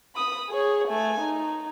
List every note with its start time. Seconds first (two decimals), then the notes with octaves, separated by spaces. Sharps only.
0.16 B5 D#6
0.50 G#4 C#5
0.88 A3 G#5
1.21 D#4